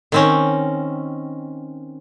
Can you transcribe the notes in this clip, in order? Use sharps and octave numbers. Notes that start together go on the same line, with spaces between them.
D#3 C4 C#4